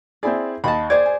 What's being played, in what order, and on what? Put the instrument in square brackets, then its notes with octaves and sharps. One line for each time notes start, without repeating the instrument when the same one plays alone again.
[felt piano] C4 E4 G#4 [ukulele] D5
[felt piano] D#2 D#5 A6 [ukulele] A5 B5
[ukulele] G#4 C5 D5 [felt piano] G#6
[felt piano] G#5